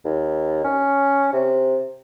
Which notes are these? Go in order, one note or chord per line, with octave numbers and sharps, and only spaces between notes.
D#2
C#4
C3